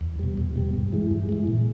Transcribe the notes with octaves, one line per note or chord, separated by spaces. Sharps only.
E2
B2 G3
E2
B2 G3
G2
E3 G#3
G2
E3 G#3
A#2